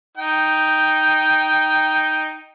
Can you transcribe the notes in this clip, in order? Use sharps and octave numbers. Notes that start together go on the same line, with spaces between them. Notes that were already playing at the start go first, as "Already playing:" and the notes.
D#4 G5